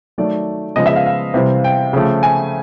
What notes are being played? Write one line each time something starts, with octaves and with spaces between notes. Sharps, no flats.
D#3 F#3 A3 D5
C#3 F3 G#3 B3 D#5
E5
F5
F5
C3 E3 G3 C4
G5
C#3 F3 A3
G#5